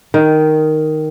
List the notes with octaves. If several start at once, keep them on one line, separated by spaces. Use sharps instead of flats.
D#3